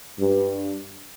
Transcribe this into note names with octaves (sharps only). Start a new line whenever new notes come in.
G2